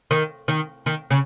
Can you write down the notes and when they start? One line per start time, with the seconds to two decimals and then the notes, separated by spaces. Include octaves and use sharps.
0.11 D#3
0.48 D#3
0.86 D#3
1.11 C#3